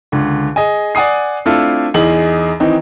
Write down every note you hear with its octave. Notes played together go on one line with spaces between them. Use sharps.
C#2 D3
G#4 D#5 G#5
D5 F#5 G#5 D#6 C7
A3 C4 D4 E4 F4 A4
E2 D#4 G#4 F#7
D#3 E3 C4 D#4